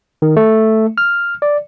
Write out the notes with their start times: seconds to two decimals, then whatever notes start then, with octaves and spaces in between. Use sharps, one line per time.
0.22 D#3
0.37 A3
0.98 F6
1.42 D5